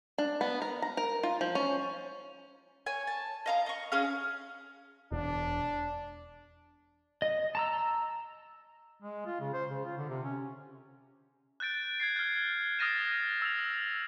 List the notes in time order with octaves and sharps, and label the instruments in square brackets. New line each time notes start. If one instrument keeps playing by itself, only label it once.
[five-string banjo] D4
B3
A#4
A#5
A#4
F4
F3
C#4
[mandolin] C#5 G#5
A5
D#5 F5 A#5
D#5 C#6
C#4 G#4 F5
[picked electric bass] E1 [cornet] D4
[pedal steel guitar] D#5
A5 A#5 E6
[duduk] G#3
F4
C#3
C5
C#3
F4
D3
C3
C#4
[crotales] F#6 G6 A6 D7
G#6 A6 C7
F6 F#6
D#6 F6 A6 A#6 D#7 E7
E6 F7